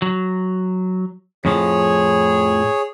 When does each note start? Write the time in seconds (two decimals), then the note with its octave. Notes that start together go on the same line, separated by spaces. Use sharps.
0.02 F#3
1.45 F2 A2 F3 G#4 C#5